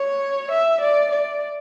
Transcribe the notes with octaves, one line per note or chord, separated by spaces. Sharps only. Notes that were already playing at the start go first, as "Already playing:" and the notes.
Already playing: C#5
E5
D5
D5